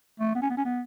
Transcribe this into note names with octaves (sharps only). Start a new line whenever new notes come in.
A3
B3
C#4
B3
C#4
B3